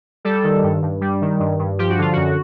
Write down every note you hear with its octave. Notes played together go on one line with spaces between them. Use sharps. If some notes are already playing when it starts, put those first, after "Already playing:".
G3 A4
D#3
G2
G2
G3
D#3
G2
G2
F3 G4
F#4
D3 F4
F#2 F#4